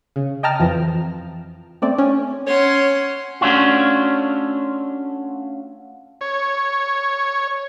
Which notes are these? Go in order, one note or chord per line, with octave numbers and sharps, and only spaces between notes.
C#3
D#5 G5 A5 A#5 F6
F2 E3 F3
A3 C4 D5
C#4
C#4 C#5 F#5 C6
A3 C#4 D4 F4 F#4
C#5